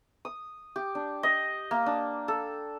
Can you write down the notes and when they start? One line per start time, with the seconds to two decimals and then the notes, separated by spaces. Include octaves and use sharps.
0.25 D#6
0.76 G4
0.95 D4
1.23 D#5
1.71 A#3
1.86 D4
2.28 A4